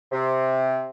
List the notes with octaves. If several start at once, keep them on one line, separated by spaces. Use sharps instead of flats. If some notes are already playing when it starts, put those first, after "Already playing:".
C3